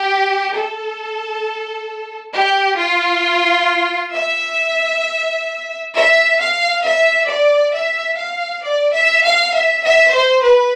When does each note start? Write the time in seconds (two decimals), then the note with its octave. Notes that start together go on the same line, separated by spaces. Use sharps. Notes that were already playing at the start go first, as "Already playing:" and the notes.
Already playing: G4
0.54 A4
2.33 G4
2.78 F4
4.12 E5
5.93 E5
6.38 F5
6.83 E5
7.27 D5
7.72 E5
8.17 F5
8.62 D5
8.92 E5
9.22 F5
9.52 E5
9.82 E5
10.12 C5
10.42 B4